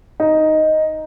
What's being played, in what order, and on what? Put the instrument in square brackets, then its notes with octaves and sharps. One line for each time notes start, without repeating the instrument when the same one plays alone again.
[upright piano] D#4